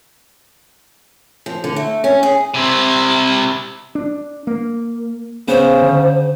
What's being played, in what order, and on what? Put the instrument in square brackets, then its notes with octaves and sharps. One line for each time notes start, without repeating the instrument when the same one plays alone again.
[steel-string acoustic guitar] F3
D3
A3
C#4
G#4
[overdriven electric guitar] C3 E4
[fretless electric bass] D4
A#3
[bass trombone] C#3 [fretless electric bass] B3 [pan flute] C5
[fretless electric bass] D3